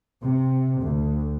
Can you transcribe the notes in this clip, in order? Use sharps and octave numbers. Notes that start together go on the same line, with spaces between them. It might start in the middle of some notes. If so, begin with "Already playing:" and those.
C3
D2